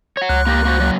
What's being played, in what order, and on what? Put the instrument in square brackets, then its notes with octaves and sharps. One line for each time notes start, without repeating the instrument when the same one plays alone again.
[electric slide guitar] C#5 F#5
[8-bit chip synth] C#2 F#6
[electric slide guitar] A#3 G4 A#4
A#3 F#4 C5
F#3 A#3